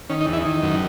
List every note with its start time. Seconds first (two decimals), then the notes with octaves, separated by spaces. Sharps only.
0.09 D#3 C#4
0.21 D#4
0.26 E2
0.33 E4
0.45 D#3
0.63 F#2